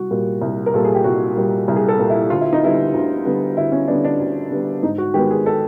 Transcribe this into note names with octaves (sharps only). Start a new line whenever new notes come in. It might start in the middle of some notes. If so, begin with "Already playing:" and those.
Already playing: C2 F#4
A#2 G3 A#3
C2
A#4
A#2 G3 A#3 A4
G#4
G4
C2 F#4
A#2 G3 A#3
C2
G#4
A4
A#2 G3 A#3
E4
D2 F4
E4
D#4
D3 G3 B3 E4
D2
D3 G3 B3
D2 E4
C#4
D3 G3 B3 D4
D4
D2
D3 G3 B3
G#2 D#4
F#4
D#3 G#3 B3 G4
G#4
A4